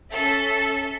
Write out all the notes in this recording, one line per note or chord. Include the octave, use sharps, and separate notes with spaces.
C#4 A4 E5